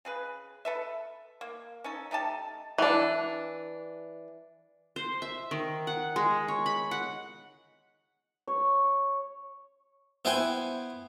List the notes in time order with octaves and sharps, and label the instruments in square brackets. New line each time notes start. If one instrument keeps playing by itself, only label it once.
[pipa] C#3 G#4 B4
A4 B4 E5
A#3
C#4 D#4 A4
A3 D#4 G4 A5
[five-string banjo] E3 D4
[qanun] C5
E5
D#3
F#5
G#3
C#5
B5
F#5
[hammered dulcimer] C#5
[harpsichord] B3 E4 B4 C5 G5 G#5